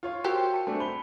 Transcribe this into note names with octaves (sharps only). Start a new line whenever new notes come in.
F4 C#5 F5
F#4 G4 A#4 C5 G5
A5 C#7
A3 C4 D4 G#5
B5 G7